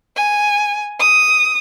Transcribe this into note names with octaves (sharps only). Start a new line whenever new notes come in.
G#5
D#6